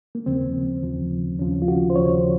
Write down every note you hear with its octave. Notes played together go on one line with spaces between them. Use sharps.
A#3
D#2 C#3 F3 C4
D#2 C#3 F3
D#2 C#3 F3 C#4
F4
F#4
C5
D#2 C#3 F3 C#5